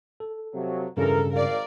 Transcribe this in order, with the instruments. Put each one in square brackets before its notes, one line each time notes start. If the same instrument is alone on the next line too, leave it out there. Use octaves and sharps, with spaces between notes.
[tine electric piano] A4
[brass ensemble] C3 F3 F#3
[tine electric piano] G2 C#3 G3 [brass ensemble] E3 G#3 A#4 [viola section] A4
[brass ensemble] G#1 C5 F5 [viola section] A#4 D5